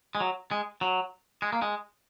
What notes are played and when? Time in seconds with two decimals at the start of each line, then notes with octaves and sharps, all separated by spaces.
0.15 G#3
0.20 F#3
0.51 G#3
0.81 F#3
1.42 G#3
1.53 A#3
1.62 G#3